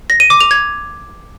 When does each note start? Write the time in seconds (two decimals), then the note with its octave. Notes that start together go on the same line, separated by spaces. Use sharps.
0.10 A#6
0.20 D#7
0.30 D6
0.41 F7
0.51 G#6